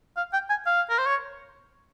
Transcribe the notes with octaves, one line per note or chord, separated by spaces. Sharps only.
F5
G5
G#5
F5
A#4
C5
C#5